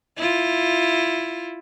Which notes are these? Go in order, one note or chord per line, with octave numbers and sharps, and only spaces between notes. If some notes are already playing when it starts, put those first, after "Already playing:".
E4 F4